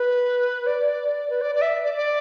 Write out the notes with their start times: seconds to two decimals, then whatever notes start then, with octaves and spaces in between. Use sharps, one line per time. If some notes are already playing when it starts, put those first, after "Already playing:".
Already playing: B4
0.66 D5
1.30 B4
1.41 D5
1.55 D5
1.62 E5
1.84 D5
1.94 D5